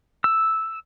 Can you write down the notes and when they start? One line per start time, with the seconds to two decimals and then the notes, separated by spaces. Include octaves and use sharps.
0.24 E6